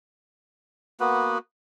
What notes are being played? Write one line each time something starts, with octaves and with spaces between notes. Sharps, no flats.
A#3 B3 F#4 B4